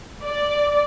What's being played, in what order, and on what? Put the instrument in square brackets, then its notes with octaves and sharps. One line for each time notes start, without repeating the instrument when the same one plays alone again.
[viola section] D5